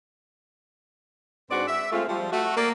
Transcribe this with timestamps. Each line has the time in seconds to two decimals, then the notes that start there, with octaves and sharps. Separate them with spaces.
1.51 G#2 C4 D4 F#4 B4 D5
1.68 E5
1.92 G#3 A3 C4 F4
2.08 F3 G3
2.32 A3 F#4
2.57 A#3 A#4 D5